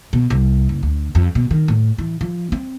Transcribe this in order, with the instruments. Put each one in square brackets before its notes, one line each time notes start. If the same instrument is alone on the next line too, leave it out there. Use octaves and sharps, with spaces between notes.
[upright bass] B2
C2
F#1
D2
F2
B2
D#3
A2
E3
F3
C4